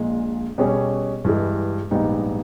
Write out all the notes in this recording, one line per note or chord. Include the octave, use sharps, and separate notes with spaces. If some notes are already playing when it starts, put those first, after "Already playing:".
Already playing: A#1 A#2 G#3
B2 G3 C#4 G#4
G2 E3 G#3
A#1 G#2 G3 B3 D#4